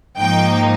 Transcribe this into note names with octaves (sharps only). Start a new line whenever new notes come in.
G#2 F3 A#3 D#4 G5